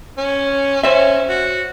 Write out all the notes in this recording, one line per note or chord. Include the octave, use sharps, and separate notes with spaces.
C#4
C#4 C5 E5
F#4